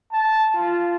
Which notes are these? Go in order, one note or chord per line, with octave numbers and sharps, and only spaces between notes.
A5
F4